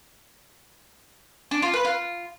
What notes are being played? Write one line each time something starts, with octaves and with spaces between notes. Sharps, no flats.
D4
F4
B4
F4